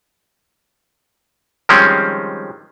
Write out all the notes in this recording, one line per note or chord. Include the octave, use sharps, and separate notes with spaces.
D#3 F3 G3 G#3 C4 C#4